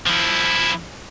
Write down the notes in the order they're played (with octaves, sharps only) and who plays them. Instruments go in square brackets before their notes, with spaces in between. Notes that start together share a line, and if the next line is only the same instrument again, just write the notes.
[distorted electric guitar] F3 E4